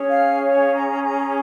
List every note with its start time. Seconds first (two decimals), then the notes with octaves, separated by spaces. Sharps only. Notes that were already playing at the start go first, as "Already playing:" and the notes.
Already playing: C#4 G#4 C#5
0.11 F5
0.42 C#5
0.72 A#5
1.03 A#5